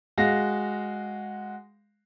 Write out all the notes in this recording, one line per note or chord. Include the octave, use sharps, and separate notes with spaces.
G#3 F#4 F5 A#6